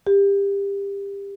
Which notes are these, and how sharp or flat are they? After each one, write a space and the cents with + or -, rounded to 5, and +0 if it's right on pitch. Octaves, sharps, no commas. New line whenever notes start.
G4 +25